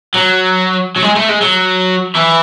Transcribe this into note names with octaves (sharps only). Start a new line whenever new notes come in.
F#3
F#3
G#3
A3
G#3
F#3
E3